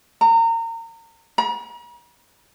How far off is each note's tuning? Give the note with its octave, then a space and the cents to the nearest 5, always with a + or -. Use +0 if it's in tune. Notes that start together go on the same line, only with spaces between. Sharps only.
A#5 -30
A#5 +45